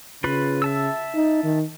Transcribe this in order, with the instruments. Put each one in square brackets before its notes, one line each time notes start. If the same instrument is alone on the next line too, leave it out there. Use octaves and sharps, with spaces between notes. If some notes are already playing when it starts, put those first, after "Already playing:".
[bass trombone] C#3 [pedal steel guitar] F4 B4 B5
[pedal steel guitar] E5 A5 E6
[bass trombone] D#4
D#3